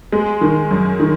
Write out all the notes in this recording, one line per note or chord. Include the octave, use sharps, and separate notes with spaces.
G#3
D#3
F#2
D#3